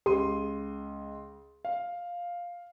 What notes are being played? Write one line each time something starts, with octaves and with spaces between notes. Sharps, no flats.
C#2 G4 C6 D#7
F5